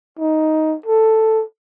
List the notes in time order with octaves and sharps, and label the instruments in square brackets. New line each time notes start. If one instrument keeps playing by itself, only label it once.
[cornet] D#4
A4